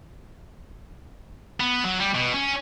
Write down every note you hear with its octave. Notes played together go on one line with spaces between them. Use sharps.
B3
F#3
G3
B2
C#4